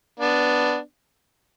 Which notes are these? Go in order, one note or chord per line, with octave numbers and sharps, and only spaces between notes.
B3 D4